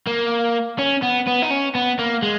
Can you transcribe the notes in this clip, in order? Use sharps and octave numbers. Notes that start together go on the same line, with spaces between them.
A#3
C#4
B3
B3
D#4
C#4
B3
A#3
G#3